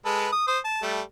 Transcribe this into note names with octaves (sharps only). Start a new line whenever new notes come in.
G#3 A4 B4
D#6
C5 D#6
A5
G3 A3